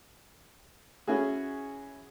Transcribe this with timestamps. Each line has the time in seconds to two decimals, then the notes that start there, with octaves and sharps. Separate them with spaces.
1.08 C#4 E4 F#4 G#4